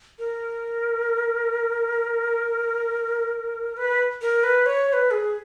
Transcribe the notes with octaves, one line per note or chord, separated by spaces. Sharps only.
A#4
B4
A#4
B4
C#5
C#5
B4
G#4